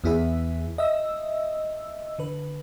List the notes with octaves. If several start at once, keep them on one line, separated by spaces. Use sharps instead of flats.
E2 B3 E4 G#4 E5
D#5 E5 E6
D3 B4